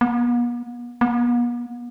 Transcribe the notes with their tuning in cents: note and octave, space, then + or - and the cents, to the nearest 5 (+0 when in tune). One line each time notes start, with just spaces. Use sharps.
B3 -45
B3 -45